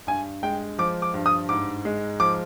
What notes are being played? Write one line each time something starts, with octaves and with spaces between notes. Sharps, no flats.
G2 G#5
G#3 G5
F3 D6
D6
G2
D#6
G#2 D6
G#3
F3 D6